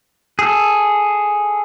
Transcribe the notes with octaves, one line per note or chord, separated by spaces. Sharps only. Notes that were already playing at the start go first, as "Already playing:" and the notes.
G#4 A4